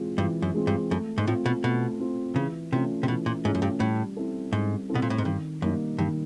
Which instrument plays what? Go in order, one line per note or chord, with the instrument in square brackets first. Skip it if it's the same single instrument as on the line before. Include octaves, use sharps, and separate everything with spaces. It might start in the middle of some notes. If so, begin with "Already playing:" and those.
Already playing: [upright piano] E3 G#3 C4 F4
[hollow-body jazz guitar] G2 [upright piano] E3
[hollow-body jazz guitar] F#2
[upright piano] G#3 C4 F4
[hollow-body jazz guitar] G2
[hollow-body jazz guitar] F#2 [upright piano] A3
[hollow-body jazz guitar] G#2
[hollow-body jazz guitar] A2 [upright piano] C4 F4
[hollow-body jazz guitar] B2
[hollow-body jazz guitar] B2 [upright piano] A3
[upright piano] C4 F4
[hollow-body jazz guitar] C#3 [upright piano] E3
[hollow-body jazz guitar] C3 [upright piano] A3 C#4 F4
[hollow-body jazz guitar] C3
[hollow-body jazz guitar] B2 [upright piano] E3
[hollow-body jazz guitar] A#2
[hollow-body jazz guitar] G#2 [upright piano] A3 C#4 F4
[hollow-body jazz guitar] F#2
G2
[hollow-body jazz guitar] A2 [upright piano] G3
[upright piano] C4 E4 A4
[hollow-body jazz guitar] G#2 [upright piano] G3
[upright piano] C4 E4 A4
[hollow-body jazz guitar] B2
A#2
A2
G#2
[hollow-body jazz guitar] G2 [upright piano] D#3
[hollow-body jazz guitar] F#2 [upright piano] G3 A#3 D#4
[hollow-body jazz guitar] G2 [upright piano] D#3